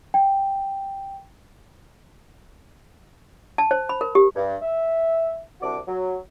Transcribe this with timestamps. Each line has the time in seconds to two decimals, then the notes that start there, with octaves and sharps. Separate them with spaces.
0.14 G5
3.58 A5
3.71 C5
3.89 B5
4.01 A#4
4.15 G4
4.35 G2
4.62 E5
5.61 C2 C3 D4 F#4 D6
5.87 F#3